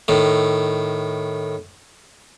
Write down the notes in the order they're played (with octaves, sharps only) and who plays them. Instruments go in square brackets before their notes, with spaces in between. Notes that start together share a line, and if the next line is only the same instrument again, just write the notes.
[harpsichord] A2 D#3